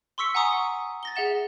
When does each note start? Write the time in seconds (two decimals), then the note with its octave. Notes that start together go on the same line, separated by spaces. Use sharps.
0.18 C6 C#6 E6 B6 C#7
0.35 F#5 G#5 A#5 C#6 D#6
0.53 F#5
1.03 A6 A#6 G7
1.16 G#4 E5 F#5 E7